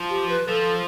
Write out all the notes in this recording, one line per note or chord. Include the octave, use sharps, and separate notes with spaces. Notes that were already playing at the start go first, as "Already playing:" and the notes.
Already playing: F3
G4
B4
F3 A4